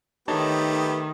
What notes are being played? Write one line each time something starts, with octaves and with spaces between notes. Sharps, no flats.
D#3 A3 B3 D#4 G4 C#5 A5